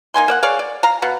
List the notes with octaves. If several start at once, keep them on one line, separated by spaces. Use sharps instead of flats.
A#3 D#4 G#5 C6
A#3 D5 F#5
G#4 C#5 D5 F5
D5
F5 A#5
B2 F5 F#5